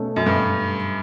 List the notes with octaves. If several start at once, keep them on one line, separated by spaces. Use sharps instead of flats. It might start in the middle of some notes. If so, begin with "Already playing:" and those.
Already playing: B2 A3 C#4
F#2
G2